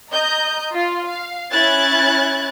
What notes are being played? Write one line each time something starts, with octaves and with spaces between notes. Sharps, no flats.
D#5 A#5 G6
F4 F5
F5
C#4 E4 F#6 G#6 A6